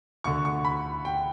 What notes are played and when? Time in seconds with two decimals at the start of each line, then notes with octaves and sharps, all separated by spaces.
0.24 D2 D3 C#6
0.45 C#6
0.65 B5
1.05 G5